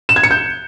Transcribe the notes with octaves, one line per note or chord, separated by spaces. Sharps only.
E7
G#6
C#7
G6